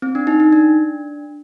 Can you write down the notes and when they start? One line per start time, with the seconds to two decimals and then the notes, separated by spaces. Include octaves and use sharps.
0.02 C4
0.15 D4
0.27 D#4
0.40 D#4
0.52 D4